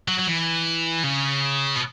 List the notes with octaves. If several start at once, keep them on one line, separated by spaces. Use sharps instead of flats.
F#3
F#3
E3
C#3
B2